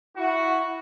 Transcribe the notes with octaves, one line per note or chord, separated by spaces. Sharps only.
E4 F#4